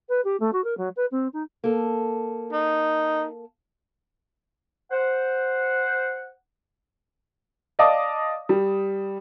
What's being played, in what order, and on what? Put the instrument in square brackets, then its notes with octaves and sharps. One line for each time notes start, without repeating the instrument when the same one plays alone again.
[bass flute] B4
G4
A3
F#4
A#4
F#3
B4
C4
D#4
[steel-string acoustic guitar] A#3 A4
[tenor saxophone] D#4
[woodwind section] C5 F#5
[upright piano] D5 D#5 F5 A5 D6 D#6
G3